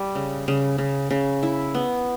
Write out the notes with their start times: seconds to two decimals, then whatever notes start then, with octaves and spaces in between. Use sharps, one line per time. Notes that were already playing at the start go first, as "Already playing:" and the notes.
Already playing: G3
0.15 C#3
0.48 C#3
0.78 C#3
1.11 C#3
1.43 E4
1.75 B3